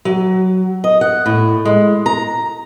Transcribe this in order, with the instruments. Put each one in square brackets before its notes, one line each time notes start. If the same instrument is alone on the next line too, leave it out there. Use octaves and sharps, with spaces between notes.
[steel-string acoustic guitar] F#3
D#5
F#5
A2
G#3
A#5